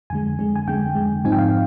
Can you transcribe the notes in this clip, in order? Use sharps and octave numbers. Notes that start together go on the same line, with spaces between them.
F2 D3 G#3 G#5
F2 D3 G#3
G#5
F2 D3 G#3 G5
F2 D3 G#3
G#2 F3 C4 D#4 G#5
G5
F5